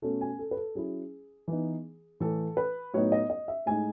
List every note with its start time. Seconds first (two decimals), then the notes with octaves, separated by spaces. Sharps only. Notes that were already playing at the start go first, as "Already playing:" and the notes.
0.02 B2 A3 C#4 A4
0.21 G#5
0.39 A4
0.51 B4
0.57 A4
0.75 F#3 C#4 E4 G#4
1.48 E3 B3 D#4
2.20 A2 E3 A3 A4
2.57 B4
2.94 A2 F#3 B3 D#4 C#5
3.12 D#5
3.30 D#5
3.48 E5
3.66 A2 G#3 D#4 G#5